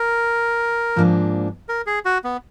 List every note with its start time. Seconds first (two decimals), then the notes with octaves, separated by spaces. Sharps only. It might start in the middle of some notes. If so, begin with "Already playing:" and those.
Already playing: A#4
0.96 G#2 F3 A#3 D4
1.69 A#4
1.86 G#4
2.05 F#4
2.24 B3